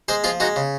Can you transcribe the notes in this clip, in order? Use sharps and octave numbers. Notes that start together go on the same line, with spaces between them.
G#3 G#4 C5
F3 F4 G#4
G#3 D#4 F#4
C#3